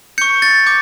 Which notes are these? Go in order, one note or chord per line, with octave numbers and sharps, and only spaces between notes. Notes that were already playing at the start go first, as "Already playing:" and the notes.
C#6 G6 C#7
A6
D6 G6